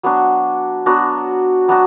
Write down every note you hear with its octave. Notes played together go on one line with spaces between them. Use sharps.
F#3 B3 D4 F#4
F#3 B3 D4 F#4
F#3 B3 D4 F#4